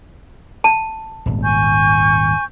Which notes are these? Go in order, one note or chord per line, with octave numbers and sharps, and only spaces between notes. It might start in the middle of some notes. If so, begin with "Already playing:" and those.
A5
D#1 G#1
G#5 C#6 G6